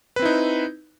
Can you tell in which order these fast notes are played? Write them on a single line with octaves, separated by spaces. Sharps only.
B4 C4 E4 D#4